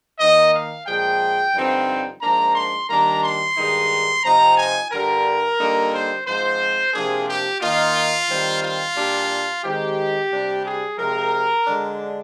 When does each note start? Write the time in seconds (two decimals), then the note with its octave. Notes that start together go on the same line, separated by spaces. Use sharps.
0.19 D#3 A#3 D#4 D#5
0.53 F5
0.86 A#2 F3 G#3 G5
1.54 G2 D3 F3 C4 D#4
2.21 G#2 F3 A#3 D4 A#5
2.55 C6
2.89 D#3 G3 A#3 D4 A#5
3.23 C6
3.56 G2 D#3 G#3 D#4
4.23 C3 F3 C4 D#4 A#5
4.57 G#5
4.91 G2 D3 G3 A#4
5.58 D3 G3 A#3 D#4
5.93 C5
6.26 G#2 F3 C4 C5
6.93 C3 F3 A#3 D4 G#4
7.27 G4
7.61 D#3 A#3 D#4 F4
8.28 D#3 G3 C4
8.62 F4
8.95 A#2 G3 D4
9.63 D#3 G#3 C4 G4
10.30 C3 G3 D4
10.64 G#4
10.98 C3 F3 G#3 A#4
11.65 D3 G#3 D4